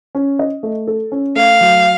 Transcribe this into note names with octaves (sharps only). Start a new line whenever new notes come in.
C#4
D#5
A3
A4
C#4
A3 F5
F#3